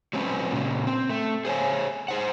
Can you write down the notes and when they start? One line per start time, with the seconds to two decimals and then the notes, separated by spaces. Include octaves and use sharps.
0.13 F#3 G#3 C4 C#4 B4
0.52 A#2 C#3
0.87 C4
1.09 A3
1.45 G#4 C5 C#5 G#5
2.08 G#4 C5 F#5